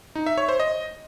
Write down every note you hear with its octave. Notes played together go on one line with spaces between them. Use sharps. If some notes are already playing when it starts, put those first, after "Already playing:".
D#4
E5
C#5
C5
D#5